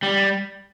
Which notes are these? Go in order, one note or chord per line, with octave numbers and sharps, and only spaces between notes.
G3